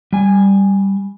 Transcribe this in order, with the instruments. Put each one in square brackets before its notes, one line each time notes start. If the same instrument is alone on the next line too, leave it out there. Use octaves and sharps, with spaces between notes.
[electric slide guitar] G3 G#5